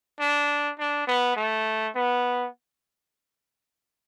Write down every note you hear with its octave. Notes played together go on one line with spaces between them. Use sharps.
D4
D4
B3
A3
B3